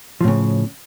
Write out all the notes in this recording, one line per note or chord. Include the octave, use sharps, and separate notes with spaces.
A2 C#3 F3